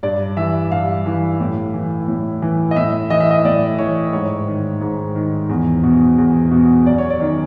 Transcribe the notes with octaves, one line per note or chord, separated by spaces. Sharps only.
G2 D5
E3 E5
G2 F5
E3
A2
E3
A2
E3
D#5
A2 E5
E3 D#5
E5
D#5
A2 D5
E3 C#5
G#2 C#5
D#3
G#2
D#3
E2
B2
E2
B2
F#2 D5
C#5
D5
D#3